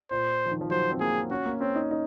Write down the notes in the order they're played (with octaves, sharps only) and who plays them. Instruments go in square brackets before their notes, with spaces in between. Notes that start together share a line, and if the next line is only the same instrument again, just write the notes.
[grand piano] A#2 [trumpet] C5
[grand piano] F3
D#3
F3
[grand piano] F#3 [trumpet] C5
[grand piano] C4
[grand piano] A#3 [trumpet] G#4
[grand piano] C#4 [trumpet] F#4
[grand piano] A#3
[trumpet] C4 [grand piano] C#4
[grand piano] D#4
D#4